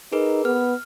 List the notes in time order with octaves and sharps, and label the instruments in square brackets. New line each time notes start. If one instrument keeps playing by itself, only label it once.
[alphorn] D#4 [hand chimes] G#4 A#4 B4
[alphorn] B3 [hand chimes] F6